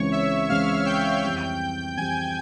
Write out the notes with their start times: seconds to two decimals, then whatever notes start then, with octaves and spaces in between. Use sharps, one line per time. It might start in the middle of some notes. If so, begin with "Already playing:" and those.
Already playing: C#2 C#3 E3 G#3 C4 C#5 C#6
0.12 E5 E6
0.49 C#2 C#3 E3 G#3 C4 F5 F6
0.86 G5 G6
1.23 F2 E3 G3 C4
1.97 F2 E3 G3 C4 G#5 G#6